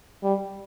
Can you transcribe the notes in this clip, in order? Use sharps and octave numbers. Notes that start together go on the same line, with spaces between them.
G3